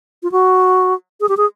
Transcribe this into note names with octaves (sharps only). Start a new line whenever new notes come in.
F4
F#4
G#4
G4
G#4